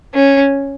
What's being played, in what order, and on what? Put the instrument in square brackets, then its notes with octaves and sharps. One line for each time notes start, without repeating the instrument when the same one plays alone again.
[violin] C#4